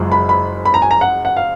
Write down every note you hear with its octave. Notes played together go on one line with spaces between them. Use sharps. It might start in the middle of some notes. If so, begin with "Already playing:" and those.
Already playing: F#1 F#2 F3 G#3
B5
B5
B5
A#5
G#5
A#5
F#5
F#5
F5